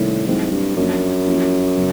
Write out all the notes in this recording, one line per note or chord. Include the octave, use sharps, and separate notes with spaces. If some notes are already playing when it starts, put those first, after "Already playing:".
Already playing: A2 C3 D#3 G3 A#3 C#4
G#2 F#3 A3 C4 E4
G2
F#2 F3 A#3 D4
F3 A#3 C#4 E4
C#3 F#3 B3